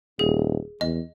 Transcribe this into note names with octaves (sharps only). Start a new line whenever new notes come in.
D#1 G#4
E2 D#5